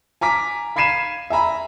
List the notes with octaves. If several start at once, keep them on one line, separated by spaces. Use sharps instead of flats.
G#5 A#5 D6 B6
F5 B5 G#6 C7 D#7 E7
E5 G#5 A#5 B5